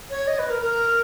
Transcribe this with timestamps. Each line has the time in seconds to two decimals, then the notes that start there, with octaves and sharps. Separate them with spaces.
0.10 C#5
0.27 D#5
0.39 B4
0.50 A#4
0.62 A#4